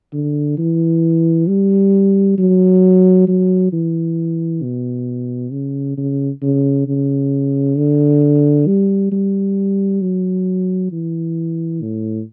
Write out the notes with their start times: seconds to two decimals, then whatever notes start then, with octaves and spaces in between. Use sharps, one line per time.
0.13 D3
0.58 E3
1.47 G3
2.38 F#3
3.28 F#3
3.72 E3
4.63 B2
5.52 C#3
5.97 C#3
6.42 C#3
6.87 C#3
7.77 D3
8.67 G3
9.12 G3
10.02 F#3
10.92 E3
11.82 A2